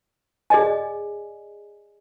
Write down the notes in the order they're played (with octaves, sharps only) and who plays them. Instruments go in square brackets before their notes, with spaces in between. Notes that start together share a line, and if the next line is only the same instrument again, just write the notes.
[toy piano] G#4 D5 D#5 G#5